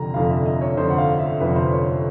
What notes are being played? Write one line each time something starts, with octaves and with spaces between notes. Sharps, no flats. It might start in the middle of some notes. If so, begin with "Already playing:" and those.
Already playing: F1 F2 D3 A#5
F1 F2 D3 F5
E5
D#5
C#5
F1 F2 D3 C5
F#5
F5
E5
F1 F2 D3 B4
C5
C#5